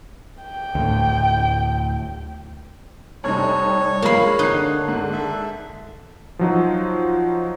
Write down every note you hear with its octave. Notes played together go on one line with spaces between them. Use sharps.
G5
D2 A2
F1 G3 D#4 C#5
F3 G#3 A#3 F5 B5
D3 D#4 F#6 C7
G#2
A4 E5
F3 F#3 D#4